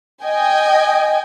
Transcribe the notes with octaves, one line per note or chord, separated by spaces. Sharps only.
D#5 G5 G#5